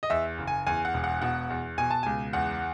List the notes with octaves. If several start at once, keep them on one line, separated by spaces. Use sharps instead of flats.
D#5
E2 E5
F#1
G#5
E2 G#5
F#5
E1
F#5
B2 F#5
E2
B2 G#5
A5
C#2 G#5
E2 F#5